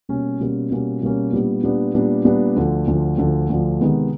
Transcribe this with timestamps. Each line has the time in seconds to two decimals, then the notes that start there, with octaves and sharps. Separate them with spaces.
0.09 B2 G3 A#3 C#4
0.40 B2 G3 A#3 C#4
0.71 B2 G3 A#3 C#4
1.01 B2 G3 A#3 C#4
1.32 A#2 G3 B3 D4
1.63 A#2 G3 B3 D4
1.94 A#2 G3 B3 D4
2.25 A#2 G3 B3 D4
2.56 D2 D3 F3
2.87 D2 D3 F3
3.18 D2 D3 F3
3.49 D2 D3 F3
3.80 C3 D#3 G#3 B3